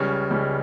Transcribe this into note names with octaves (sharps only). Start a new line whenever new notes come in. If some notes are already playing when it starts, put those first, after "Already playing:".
Already playing: C#2 C#3 G3 C#4
C#2 C#3 G3 C#4